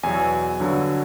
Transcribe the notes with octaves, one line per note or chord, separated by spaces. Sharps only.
E2 B2 F#3 G#5
G2 D3 F#3